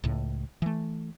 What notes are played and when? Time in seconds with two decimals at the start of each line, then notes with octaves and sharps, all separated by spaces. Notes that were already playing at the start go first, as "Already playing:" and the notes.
0.04 C#2 A2
0.62 E3 A3